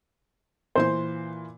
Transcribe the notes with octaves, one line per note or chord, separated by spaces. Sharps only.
A#2 E3 C5 C6